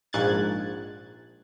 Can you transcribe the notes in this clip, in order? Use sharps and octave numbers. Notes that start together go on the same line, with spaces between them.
A#1 G#2 F#6 G#6 A6